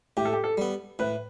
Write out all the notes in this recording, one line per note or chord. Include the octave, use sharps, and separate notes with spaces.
A2 G4
A4
G4
A4
G3 B3
A2 B4